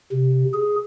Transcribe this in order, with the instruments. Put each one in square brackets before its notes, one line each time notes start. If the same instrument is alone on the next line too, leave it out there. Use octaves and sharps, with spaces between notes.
[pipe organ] C3
G#4